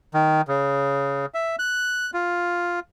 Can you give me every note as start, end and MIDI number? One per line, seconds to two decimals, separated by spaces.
0.14 0.41 51
0.48 1.26 49
1.34 1.56 76
1.59 2.11 90
2.14 2.80 65